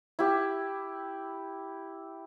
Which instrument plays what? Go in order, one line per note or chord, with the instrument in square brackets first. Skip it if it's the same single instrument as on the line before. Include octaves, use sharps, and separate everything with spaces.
[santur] E4 G4